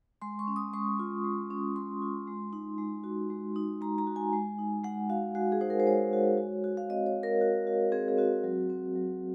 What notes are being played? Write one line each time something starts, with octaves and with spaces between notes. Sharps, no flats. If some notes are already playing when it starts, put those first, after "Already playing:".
G#3 C6
C#6
C#4
D#6
G#3 C#6
F4
G#3
C#4
G#3 C6
F4
G#3
D#4
G#3
F#4
G#3
D#4
G#3 A#5
A#5
F#4
G#5
G#3
D#4
G#3 F#5
F#4 F5
G#3 F#4
G#4
D#4 C5
A#4
C5
G#3 C#5
F#4
F#4
F#4
F5
C4 D#5
C#5
C4
A#4
F#4
F#4
C4 G#4
G#4
C4 F#4
F#3
C4
F#3